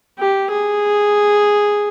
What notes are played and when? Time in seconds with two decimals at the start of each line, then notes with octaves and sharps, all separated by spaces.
0.19 G4
0.51 G#4